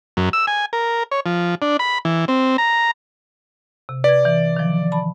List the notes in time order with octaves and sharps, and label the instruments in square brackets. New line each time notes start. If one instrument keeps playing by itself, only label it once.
[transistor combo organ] F#2
E6
G#5
A#4
C#5
F3
D4
B5
E3
C4
A#5
[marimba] C3
[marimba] B4 G#6 [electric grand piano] D5
[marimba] E3
D#3 F3
A5 B5